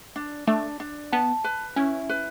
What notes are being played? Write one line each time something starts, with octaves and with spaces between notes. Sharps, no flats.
D4
A3 D4
D4
B3 A5
B4
C#4 E4
B4